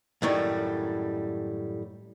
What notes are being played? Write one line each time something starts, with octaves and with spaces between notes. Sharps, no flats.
F#2 A2 D#3 G3